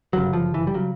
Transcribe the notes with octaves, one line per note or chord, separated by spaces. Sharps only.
G1 F#2 C#3 F#3
F3
E3
G3
C#3 F#3